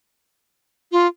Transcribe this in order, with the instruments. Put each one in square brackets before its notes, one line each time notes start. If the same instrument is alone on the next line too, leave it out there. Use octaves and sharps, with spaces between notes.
[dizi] F4